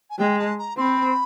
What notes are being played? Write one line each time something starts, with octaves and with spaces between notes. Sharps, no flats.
G#5
G#3 G5
A5
A#5
C4 B5 C6